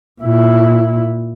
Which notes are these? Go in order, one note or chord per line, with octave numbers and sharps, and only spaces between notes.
A#2 E4